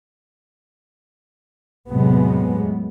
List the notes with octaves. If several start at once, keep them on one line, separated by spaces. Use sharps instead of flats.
E2 A2 C3 F#3 G#3 B3